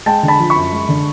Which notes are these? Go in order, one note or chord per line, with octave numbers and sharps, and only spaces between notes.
G#3 G5 A5
D3
A5 B5
F3
B5 C#6
F#2
G#3
D3